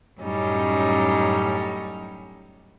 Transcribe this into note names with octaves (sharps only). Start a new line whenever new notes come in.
F#2 A2 F#3 G3 C#4 D#4